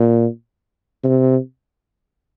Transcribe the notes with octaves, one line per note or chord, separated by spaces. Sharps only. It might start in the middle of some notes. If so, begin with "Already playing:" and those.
Already playing: A#2
C3